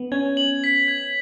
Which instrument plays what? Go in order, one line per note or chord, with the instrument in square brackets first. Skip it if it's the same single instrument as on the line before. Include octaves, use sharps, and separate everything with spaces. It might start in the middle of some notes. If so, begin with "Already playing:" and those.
Already playing: [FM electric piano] B3
[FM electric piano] C#4 [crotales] G#6
[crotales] F#7
B6
G#6